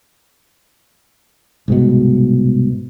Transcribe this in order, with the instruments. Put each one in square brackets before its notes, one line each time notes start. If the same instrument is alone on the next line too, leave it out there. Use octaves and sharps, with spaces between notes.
[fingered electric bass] C2 G#2 B2